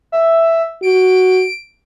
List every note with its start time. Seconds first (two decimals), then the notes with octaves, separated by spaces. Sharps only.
0.12 E5
0.83 F#4 D7